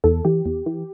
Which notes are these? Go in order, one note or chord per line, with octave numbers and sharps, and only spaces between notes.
E2 A4
E3 G4
E2
E3